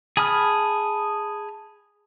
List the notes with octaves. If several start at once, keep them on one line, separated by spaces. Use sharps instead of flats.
G#4 A5 B5 D#6 F6